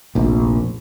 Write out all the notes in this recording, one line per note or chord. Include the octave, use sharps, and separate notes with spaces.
F1 A#1